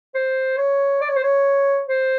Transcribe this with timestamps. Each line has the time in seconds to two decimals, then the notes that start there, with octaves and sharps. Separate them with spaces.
0.15 C5
0.58 C#5
1.01 D5
1.09 C#5
1.16 C5
1.23 C#5
1.88 C5